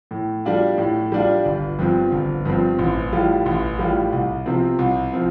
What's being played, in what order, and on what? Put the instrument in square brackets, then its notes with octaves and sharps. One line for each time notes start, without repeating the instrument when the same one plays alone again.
[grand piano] A2
G3 D4 F4
A2
G3 D4 F4
G1
G2 F3 C4
G1
G2 F3 C4
A1
A2 G3 F4
A1
A2 G3 F4
C2
C3 F3 C4
C2
F3 C4